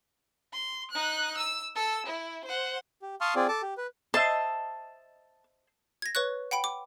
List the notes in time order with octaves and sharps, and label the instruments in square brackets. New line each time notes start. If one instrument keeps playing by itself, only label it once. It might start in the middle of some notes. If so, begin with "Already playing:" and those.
[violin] C6
D#4 F#6
E6
A4 E6
E4
C5 F#5
[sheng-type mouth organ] G4
F5 A5 C6 C#6 D#6 F6
C4 F4 G#4 D5
A4 A5 D6
G4
B4
[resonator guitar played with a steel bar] C5 D#5 E5 [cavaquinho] A5
[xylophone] G#6 A#6
B4 C#5 C#6 F#6
F#5 G5 B5 D7
D6